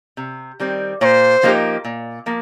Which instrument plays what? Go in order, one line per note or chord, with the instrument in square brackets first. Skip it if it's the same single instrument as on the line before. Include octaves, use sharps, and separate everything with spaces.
[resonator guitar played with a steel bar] C3
D#3 G3 C4
[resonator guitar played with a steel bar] A#2 [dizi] C5 C#5
[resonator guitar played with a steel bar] F3 A#3 D#4 G4
A#2
F3 A#3